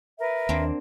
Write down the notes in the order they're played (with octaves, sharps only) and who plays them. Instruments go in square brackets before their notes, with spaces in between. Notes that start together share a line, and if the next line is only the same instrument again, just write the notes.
[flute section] A#4 B4 [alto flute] E5
[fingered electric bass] D#2 [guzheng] A#3 C4 D4